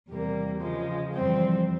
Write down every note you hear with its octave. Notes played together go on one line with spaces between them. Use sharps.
E2 C3 G3 A#3
C#3 F3 G#3
F2 E3 G3 C4